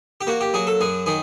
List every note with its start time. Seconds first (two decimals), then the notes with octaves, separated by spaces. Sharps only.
0.21 G4
0.27 A#3 F#4
0.41 G4
0.54 F#3 G#4
0.67 A4
0.81 F#2 G#4
1.06 D#3 G#4